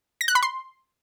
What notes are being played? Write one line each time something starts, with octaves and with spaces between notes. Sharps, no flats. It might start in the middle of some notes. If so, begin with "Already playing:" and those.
A#6
F#6
B5
C6